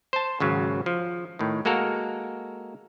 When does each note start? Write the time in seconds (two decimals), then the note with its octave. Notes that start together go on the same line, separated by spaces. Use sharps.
0.13 C5 A5
0.40 G#1 C#3 F#3
0.86 F3
1.39 A2 D#3
1.65 G#3 A#3 F#4 A4 A#4